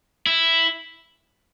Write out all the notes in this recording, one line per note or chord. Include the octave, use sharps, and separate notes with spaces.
E4